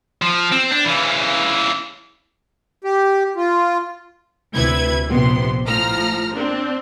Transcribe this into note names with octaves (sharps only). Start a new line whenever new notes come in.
F3
C4
D4
C#3 E3
G4
F4
D2 C3 E4 B4 G#6
A#1 C3 B3 C6
A2 F3 A#5 F6
C4 D4